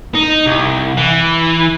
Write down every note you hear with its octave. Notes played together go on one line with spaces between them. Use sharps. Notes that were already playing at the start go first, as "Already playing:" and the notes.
D#4
C2
E3